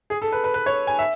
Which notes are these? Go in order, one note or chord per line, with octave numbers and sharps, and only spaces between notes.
G#4
A4
B4
B4
B4
C#5
G#5
E5